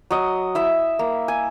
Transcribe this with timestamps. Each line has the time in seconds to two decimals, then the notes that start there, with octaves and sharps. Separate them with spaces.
0.11 F#3 D#5
0.55 E4 E5
0.99 A#3
1.28 G#5